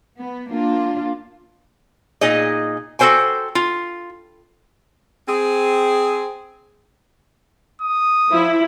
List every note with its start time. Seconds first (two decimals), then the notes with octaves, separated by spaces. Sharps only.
0.19 B3
0.50 A#3 D4 F4
2.21 A#2 D#4 G#4 D#5
2.99 F#4 A4 A#4 C5 G5 G#5
3.55 F4
5.27 C4 G#4
7.82 D#6
8.31 F3 E4